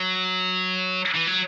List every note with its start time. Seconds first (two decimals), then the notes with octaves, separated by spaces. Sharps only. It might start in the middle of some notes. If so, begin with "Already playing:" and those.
Already playing: F#3
1.15 E3
1.27 F#3